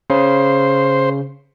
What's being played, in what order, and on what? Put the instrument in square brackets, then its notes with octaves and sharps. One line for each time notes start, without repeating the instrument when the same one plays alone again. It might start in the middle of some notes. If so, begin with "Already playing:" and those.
[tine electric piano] C#3 [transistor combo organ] C5